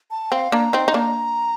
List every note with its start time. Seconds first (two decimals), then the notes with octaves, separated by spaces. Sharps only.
0.11 A5
0.31 C4 F5
0.52 A#3 D4 A#5
0.73 C4 D#4 C6
0.88 D#4
0.94 A#3 D4 A#5